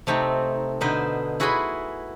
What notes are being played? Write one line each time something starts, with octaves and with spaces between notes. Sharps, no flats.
C3 A3 C4 D#4
B2 D3 D#4 B4 C5
E4 F#4 G#4 B4 B5 C6